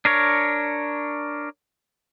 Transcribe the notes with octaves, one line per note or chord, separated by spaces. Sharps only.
D4 A#4 C#5